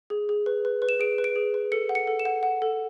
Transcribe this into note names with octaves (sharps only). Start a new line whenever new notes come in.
G#4
G#4
B4
B4
B4
E7
G#4 D7
B4
D7
G#4
B4
A4 C#7
F#5
C#7
A4
E7
F#5
F#5
A4